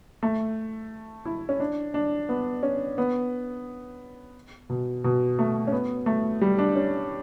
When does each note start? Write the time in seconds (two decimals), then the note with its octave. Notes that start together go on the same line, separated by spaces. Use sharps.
0.23 A3
1.25 E4
1.49 C#4
1.60 D4
1.94 D4
2.29 B3
2.63 C#4
2.98 B3
4.70 B2
5.04 B2
5.39 A3
5.67 C#4
5.72 B3
6.06 A3
6.41 G3
6.58 D4
6.76 C#4